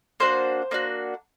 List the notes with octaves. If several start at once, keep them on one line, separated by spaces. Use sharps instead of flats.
A#3 D4 F#4 C5
A#3 D4 F#4